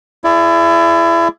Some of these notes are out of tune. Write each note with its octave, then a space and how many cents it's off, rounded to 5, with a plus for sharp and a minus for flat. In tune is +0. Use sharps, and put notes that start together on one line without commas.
E4 +30 G#4 +25 D5 +0